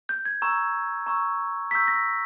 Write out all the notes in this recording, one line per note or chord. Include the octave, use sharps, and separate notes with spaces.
G6
G#6
A#5 C#6 E6
A#5 C#6 E6
A#5 C#6 E6 G6 B6
A#6